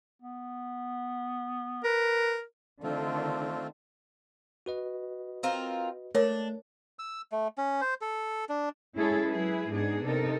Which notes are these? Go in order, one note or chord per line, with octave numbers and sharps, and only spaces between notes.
B3
A#4 B4
D3 D#3 A3 C4 D4 F4
F#4 B4 D#5
C4 F4 A#4
A3 D4 A#4 C#5
E6
A3
C#4
C5
A4
D4
G#3 C#4 E4 G#4 A4 C#5
F#3 E4 G#4 B4
G#2 B3 D4 D#4 G#4
C3 D#4 A4 A#4